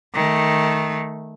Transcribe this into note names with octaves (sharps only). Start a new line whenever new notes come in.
D#3 A3